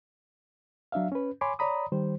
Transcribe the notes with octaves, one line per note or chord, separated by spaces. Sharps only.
F#3 D4 E5 F5
C#4 B4
C#5 G#5 B5 C6 D6
C#5 D5 A#5 B5 D#6
D#3 G3 C5